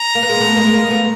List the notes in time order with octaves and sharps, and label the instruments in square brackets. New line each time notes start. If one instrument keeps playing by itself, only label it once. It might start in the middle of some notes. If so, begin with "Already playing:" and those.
Already playing: [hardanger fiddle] A#5
[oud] A#3
B3
G#3 A#3
A3 B3
G#3 A#3
G#3 A#3
A3 B3